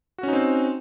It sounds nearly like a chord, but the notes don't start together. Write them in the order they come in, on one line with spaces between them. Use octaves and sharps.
F#4 C#4 D#4 C4